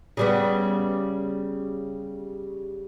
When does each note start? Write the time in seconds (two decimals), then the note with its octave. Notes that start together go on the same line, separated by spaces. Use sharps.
0.17 C#3 G3 B3